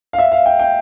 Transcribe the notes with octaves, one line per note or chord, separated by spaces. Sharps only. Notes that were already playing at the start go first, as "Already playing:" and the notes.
F5
E5
F5
G5
G5